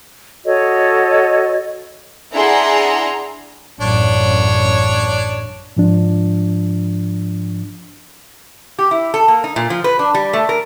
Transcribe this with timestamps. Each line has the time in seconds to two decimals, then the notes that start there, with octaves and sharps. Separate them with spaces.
0.45 F#4 A4 C#5 D#5
2.32 D4 E4 G#4 F#5 A#5 C6
3.80 A1 F#2 D4 C#5
5.77 G#2 F3 D4
8.79 G4
8.91 E4
9.14 A4
9.28 A#3
9.44 D#4
9.56 A#2
9.70 F3
9.84 B4
9.99 D4
10.14 G3
10.33 A3
10.49 A#4